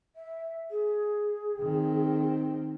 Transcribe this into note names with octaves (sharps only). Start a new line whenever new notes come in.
E5
G#4
D#3 C4